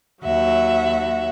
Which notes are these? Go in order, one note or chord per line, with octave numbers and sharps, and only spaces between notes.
D#2 F#3 E5 F#5